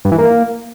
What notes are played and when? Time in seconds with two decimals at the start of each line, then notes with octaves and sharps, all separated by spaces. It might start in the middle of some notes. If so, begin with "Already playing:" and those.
0.05 G2
0.12 E3
0.18 A#3